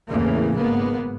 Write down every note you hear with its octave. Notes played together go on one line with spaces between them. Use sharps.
E2 A2 C#3 E3 A#3
G#1 G#2 A#3 B3